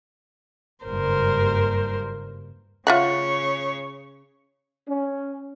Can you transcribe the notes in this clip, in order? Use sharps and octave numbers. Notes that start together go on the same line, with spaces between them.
F#1 G2 A#4 C5
C#3 F4 C#5 E5 F#5
C#4